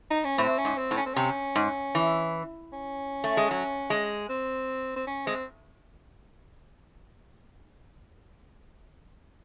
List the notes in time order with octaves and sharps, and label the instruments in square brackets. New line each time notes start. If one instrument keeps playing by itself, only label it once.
[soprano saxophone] D#4
C#4
[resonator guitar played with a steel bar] A2 [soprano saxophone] C4
[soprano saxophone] C#4
[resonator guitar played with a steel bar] G#2
[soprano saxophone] C4
[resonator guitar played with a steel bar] A2
[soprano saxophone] C#4
C4
[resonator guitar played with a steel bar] C3 [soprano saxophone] C#4
[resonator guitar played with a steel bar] G#2
E3
[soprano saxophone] C#4
[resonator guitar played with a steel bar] A3
G#3
F#3
G#3
[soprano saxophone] C4
C4
C#4
[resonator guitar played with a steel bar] G#3 [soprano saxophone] C4